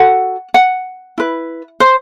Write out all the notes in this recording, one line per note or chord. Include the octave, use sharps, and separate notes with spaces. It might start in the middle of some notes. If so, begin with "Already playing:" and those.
Already playing: F#4 A4 F#5
F#5
E4 B4
C5